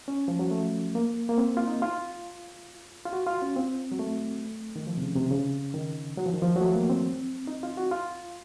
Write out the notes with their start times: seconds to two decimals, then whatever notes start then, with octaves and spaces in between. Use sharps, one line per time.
0.08 C#4
0.28 F3
0.39 F#3
0.51 A3
0.95 A#3
1.29 A#3
1.38 C4
1.57 F4
1.68 D#4
1.82 F4
3.05 F4
3.13 F#4
3.27 F4
3.42 C#4
3.56 C4
3.92 F#3
3.99 A3
4.76 D#3
4.87 F3
4.97 C3
5.02 C#3
5.16 C3
5.31 C#3
5.74 D#3
6.17 F#3
6.26 F3
6.34 D#3
6.42 F3
6.56 F#3
6.61 A3
6.75 A#3
6.90 C4
7.47 D#4
7.63 F4
7.77 F#4
7.91 F4